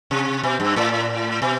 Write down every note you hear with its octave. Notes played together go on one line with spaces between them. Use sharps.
C3
B2
G2
A2
B2